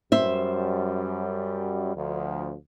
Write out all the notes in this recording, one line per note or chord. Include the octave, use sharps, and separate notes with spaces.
F#2 G3 C5 E5
D2 F3